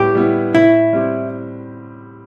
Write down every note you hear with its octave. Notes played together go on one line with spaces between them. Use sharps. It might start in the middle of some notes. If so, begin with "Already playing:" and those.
Already playing: A2 G3 B3 E4 G4
G3 B3 E4
A2 E4
G3 C4 G4